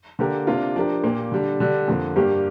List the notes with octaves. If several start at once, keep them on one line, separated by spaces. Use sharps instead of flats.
D3 A#3 G4 A#4
C3 A#3 D4 F4
F3 D4 G4 A#4
A#2 A#3 G4
D3 G3 D4
D3 G3 D4
F2 D3 A#3
G2 G3 A#3 G4